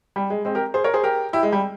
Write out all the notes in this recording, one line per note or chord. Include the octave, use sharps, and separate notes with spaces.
G3
G#3
G#3 C4
G4 A#4
G#4 C5
A#4 C#5
G#4 C5
G4 A#4
E4 G4
G#3
G3